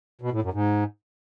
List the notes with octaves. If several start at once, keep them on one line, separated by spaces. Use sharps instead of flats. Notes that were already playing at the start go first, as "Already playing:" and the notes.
B2
A2
F#2
G#2